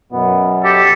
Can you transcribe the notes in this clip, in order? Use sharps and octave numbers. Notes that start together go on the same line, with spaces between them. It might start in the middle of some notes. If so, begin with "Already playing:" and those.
F#2 B2 B3
G4 A4